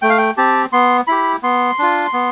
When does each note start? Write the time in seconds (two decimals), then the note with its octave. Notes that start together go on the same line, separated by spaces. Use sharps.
0.02 A3 G5
0.10 F5
0.18 G5
0.37 C4 G4 A5
0.73 B3 C6
1.07 E4 G4 B5
1.43 B3 C6
1.79 D4 F4
2.13 B3